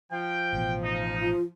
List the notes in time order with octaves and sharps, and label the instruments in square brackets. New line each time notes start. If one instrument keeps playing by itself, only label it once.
[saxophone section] F3 [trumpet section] G5
[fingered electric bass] A1 B2
[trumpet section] D#4
[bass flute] F4